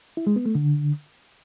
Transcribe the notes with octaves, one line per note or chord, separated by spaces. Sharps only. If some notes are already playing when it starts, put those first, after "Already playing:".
E4
G#3
B3
A3
D3